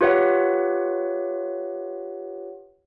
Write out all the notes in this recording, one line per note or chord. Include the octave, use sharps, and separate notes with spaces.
F4 G4 B4 C#5 E5 F#5